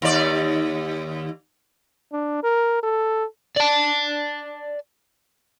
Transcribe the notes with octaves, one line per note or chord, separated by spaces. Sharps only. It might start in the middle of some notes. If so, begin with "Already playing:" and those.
D#2 D5
D4
A#4
A4
D5 A5